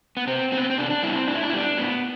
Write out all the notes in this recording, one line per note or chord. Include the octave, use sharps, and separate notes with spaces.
B3
C3 C4
G3 C4
B3
C4
C3 D4
D4
G3 B3 E4
C4
A2 D4
E4
D4
E4
G3 B3 D4
A2 B3